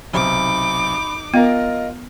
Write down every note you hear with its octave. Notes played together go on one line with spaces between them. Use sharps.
B1 C3 D#4 B5 D6
B3 F4 A#4 D#5